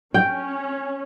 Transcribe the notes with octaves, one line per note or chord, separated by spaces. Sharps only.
C#4 G5